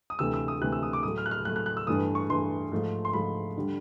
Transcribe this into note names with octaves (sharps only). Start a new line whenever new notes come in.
D#6
D2 C3 E3 A3 E6
E6
D#6
D2 C3 E3 A3 F#6
E6
D#6
D6
A2 F#3 A3 D#6
F6
F#6
F6
A2 F#3 A3 F#6
F#6
F#6
E6
G2 E3 A3 D#6
C#6
G2 E3 A3 C6
G#2 F3 A3
C6
G#2 F3 A3 B5
D3 G3